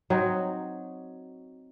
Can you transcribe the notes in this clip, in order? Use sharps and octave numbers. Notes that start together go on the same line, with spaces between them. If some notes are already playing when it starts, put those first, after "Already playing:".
F#3 C4 D#4 F#4